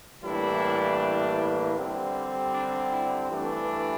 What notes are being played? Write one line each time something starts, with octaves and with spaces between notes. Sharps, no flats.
A2 E3 G3 A#3 D4 E4
D3 G3 C4
D4
E4
G2 E3 A3 D4